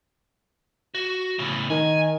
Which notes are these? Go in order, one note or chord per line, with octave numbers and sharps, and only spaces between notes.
F#4
A2 C#3
D#3 G#5